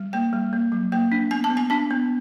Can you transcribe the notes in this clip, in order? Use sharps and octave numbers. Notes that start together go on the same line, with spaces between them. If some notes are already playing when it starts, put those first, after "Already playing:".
Already playing: G3
A#3 G5
G3
A#3
F#3
A#3 G5
D4
B3 G#5
A5
B3
G#5
D4 A5
B3